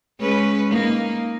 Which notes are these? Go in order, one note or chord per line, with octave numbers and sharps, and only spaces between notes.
G#3 C#4 B4
A#3 D#4